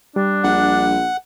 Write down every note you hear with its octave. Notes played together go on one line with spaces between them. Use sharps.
G3 D4
A#1 F#5